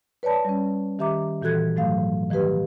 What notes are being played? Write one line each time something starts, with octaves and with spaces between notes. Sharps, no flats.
B4 C#5 D5 A5 B5
G3 C#4
D#3 G4 E5 A#5 D6
A#2 E3 F#4 A4 F#6 G#6
G#2 F#3 A3 F5
D#3 F3 A3 G4 B4